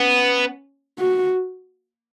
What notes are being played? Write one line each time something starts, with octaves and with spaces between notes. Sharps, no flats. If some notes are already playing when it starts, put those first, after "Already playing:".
Already playing: B3 C#4
F#4